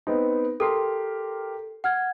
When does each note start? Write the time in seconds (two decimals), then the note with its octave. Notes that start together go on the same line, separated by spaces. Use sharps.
0.07 B3 C4 D#4
0.60 G4 A4 A#4 C6
1.84 F#5 F6 G#6